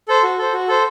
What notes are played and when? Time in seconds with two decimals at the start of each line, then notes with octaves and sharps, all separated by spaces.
0.08 A4 C5
0.23 F#4
0.38 A4 C5
0.53 F#4
0.68 A4 C5